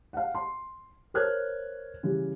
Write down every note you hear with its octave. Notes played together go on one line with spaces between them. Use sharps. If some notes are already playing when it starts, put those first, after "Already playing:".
F5 F#5
C6
A#4 C5 C#5 F6 F#6 G#6
C#3 E3 G3